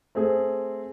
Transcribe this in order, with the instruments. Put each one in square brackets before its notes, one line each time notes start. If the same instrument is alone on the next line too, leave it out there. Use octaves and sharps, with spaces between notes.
[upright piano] A3 C4 G#4